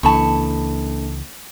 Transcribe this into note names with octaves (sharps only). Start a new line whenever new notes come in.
C#2 E3 A#3 D4 A4 A5 B5 C#6